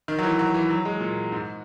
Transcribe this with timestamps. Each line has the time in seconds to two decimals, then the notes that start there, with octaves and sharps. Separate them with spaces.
0.08 D#3
0.18 F#3
0.23 E3
0.39 F#3
0.54 E3
0.70 F#3
0.85 G#3
1.00 A#2
1.32 G#2